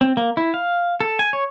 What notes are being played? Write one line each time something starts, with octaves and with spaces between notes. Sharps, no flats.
C4
A#3
E4
F5
A4
G#5
C#5